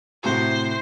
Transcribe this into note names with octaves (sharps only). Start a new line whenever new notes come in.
A2 C3 F#4 C5